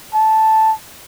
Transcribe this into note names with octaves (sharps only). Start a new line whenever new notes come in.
A5